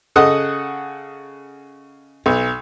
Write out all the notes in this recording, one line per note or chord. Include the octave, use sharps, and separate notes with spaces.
C#3 A4 D#5 F#5 D#6
B1